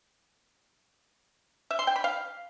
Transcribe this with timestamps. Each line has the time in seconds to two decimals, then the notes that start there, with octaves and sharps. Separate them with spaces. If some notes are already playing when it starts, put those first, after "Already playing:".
1.71 E5
1.79 C6
1.87 G5
1.96 B5
2.04 F5